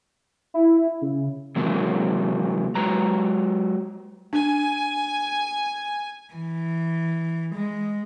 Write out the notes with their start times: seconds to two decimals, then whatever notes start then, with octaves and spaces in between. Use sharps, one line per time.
0.54 E4
1.02 C#3
1.56 C3 E3 F#3 G#3 A#3
2.75 F#3 G#3 B4 A#5
4.33 D4 G#5
6.34 E3
7.54 G#3